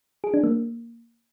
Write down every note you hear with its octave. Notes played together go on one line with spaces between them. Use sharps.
G#4
D4
A#3